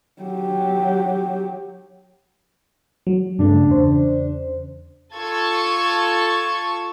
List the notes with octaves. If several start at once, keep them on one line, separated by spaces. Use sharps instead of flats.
F#3 G4
F#3
G2 C#3 A3 D4
E2 C#3 C5
F4 A4 C#6 G#6